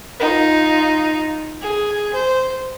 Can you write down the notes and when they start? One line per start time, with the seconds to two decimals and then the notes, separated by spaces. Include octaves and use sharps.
0.20 D#4 F4
1.61 G#4
2.14 C5